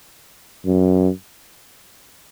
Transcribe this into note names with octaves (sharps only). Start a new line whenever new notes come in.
F#2